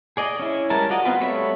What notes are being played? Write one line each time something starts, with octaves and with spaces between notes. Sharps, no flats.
G#4 D5 D#5
C#4 E4
G3 G#3 C#4 A#4 A5
F4 F#4 D5 D#5
B3 C4 F4 F#4 B4
G3 A3 C#5 E5 B5